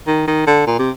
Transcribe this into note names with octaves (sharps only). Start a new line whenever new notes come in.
D#3
D#3
D3
A#2
C3